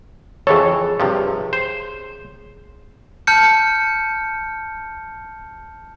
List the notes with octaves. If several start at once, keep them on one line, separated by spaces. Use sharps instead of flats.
F2 E3 G#4 A4 C#5
G2 C3 F3
C5
A5 F6 G6 C#7